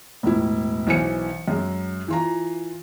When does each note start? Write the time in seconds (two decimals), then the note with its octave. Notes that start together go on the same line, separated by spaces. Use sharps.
0.23 E1 A2 E4
0.87 B1 E3 C5 G#5 C#7
1.48 F#2 G#3
2.08 E3 F4 A#5